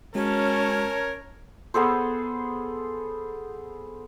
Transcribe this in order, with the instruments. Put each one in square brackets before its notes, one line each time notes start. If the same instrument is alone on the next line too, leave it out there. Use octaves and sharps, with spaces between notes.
[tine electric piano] G#3 F#4 [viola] C#4 A5 [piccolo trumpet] A#4 [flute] C#5
[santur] B3 G#4 A4 C5